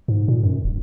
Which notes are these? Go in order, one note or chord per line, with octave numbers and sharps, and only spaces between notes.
G#2
A#2
F#2
D#1